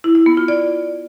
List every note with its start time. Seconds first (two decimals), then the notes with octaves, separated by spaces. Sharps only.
0.04 E4
0.15 E4
0.26 B3
0.37 F4
0.48 D5